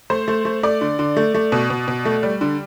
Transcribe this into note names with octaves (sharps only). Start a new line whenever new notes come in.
A3 C5
A3
A3
A3 D5
D3
D3
A3
A3
B2
B2
B2
A3
G3
D3